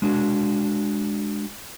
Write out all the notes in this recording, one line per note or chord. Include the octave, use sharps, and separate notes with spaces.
G#3 D4 F#4